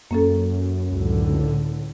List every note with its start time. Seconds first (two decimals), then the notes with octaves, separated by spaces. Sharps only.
0.11 F#2 A#3 C#4 A4
0.89 C#2 A2 D3